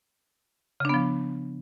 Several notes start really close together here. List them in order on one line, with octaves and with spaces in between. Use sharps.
C#3 D4 B3 F3